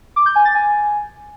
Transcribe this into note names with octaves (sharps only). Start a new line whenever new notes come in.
D6
G6
G#5
A6
G#5